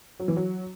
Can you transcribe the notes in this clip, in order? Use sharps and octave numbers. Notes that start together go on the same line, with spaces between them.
F#3
E3
F#3